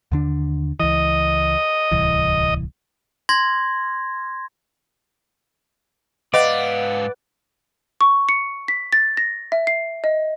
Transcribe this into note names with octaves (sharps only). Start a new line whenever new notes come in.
D#2 D3 D4
C#2 E3 D#5
D1 C2 E3
C6 G#6 A#6
G#2 B3 D5 D#5 F5
C#6
C#7
B6
A6
A#6
E5
C7
D#5